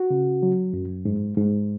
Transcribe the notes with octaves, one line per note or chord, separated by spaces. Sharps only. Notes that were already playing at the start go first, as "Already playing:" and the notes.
Already playing: F#4
C#3
F#3
F#2
G#2
G#2